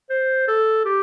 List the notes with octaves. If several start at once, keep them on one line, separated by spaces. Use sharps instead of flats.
C5
A4
G4